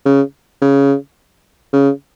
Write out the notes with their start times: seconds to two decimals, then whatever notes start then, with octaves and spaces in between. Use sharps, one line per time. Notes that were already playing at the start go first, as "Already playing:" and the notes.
0.05 C#3
0.62 C#3
1.73 C#3